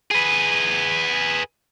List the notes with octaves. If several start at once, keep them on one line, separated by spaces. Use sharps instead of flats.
G#4 B4